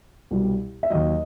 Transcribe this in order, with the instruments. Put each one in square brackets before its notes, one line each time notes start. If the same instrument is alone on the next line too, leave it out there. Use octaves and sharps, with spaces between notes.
[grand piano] C2 B2 G3
E5
D#2 D#3 F#3 D#5